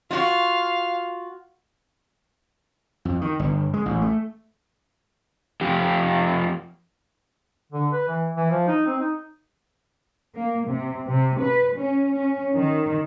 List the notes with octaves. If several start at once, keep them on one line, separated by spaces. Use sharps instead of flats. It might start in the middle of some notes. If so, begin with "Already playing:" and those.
F4 F#4 F5
F2
D#3
G1
G#3
A1
A3
F2 G4
D3
B4
E3
E3
F3
D#4
C4
D#4
A#3
C3
C3
B4
C#4
C#4
D#3